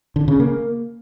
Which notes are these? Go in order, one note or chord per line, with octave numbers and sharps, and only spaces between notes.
D3
C#3
A#3